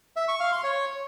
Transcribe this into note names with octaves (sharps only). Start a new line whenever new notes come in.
E5
C#6
F5
C6
C#5